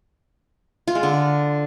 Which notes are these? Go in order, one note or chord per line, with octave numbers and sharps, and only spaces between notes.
F4
G#3
D3